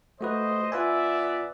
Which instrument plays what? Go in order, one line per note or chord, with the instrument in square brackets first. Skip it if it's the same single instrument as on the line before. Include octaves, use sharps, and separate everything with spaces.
[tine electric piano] A3 F#4 B4 [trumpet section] C5 D#5
[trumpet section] B3 D5 E5 [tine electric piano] F4 B4 G#5